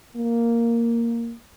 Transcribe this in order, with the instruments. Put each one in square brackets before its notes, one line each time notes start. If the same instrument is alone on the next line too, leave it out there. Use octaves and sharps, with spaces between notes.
[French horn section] A#3